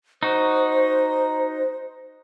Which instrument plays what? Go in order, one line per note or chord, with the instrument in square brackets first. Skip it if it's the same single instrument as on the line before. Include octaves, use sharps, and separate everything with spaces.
[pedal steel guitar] D#4 F#4 [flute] C5